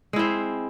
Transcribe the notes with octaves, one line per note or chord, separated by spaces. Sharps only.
G#3 C4 E4